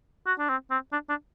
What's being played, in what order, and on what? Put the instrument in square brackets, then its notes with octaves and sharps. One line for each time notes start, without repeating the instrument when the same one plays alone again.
[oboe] F#4
D4
C4
C4
D4
D4